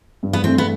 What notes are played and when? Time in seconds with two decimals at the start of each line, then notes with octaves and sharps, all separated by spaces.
0.23 G2
0.33 B3
0.44 E3 A3 C4
0.58 B3